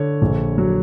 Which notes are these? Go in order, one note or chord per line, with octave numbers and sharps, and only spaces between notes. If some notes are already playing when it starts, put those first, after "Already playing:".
Already playing: D3 C#5
A#1
F#3